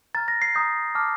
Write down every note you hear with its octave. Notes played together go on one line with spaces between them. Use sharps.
A#5 F6 A6
A#6
C7
A#5 D#6 G6
A5 D6 F6